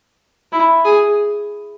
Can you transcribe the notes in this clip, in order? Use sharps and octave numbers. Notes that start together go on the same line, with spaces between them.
E4
G#4